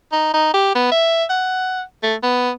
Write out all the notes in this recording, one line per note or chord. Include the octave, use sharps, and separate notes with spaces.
D#4
D#4
G4
B3
E5
F#5
A3
B3